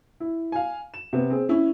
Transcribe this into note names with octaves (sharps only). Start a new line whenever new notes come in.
E4
F5 G#5
E7
C3 B3
C4 G#4
C#4 E4